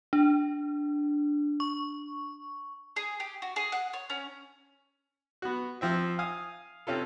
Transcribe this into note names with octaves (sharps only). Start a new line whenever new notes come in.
D4
C#6
G#4
G4
F#4
G#4
F#5
C#5
C#4
B3 F#4
F3 C4 E5
F5 G#5 D#6
C3 C#4 F4 A4